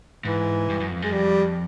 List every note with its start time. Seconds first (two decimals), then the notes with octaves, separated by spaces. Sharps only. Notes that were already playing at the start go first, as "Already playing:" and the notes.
0.25 G#2 E3
0.69 G2
0.80 F#2
0.91 F2
1.02 F#2 G#3
1.12 F2 G3